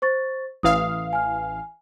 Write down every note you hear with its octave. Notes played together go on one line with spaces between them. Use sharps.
C5 C#6 A6
A1 E3 F5 D#6
G#5 F6